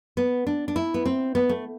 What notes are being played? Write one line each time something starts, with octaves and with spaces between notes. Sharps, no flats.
B3
D4
D4
E4
B3
C4
B3
A3